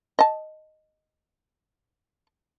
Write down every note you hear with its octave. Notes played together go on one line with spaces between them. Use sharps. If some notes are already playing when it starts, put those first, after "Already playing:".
D#5 A5